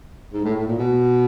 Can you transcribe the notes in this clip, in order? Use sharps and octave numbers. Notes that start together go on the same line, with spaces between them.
G#2
A2
A2
A#2
B2